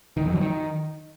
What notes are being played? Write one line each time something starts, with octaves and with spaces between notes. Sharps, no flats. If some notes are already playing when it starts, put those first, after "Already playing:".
D#3
F2
F#3
D#3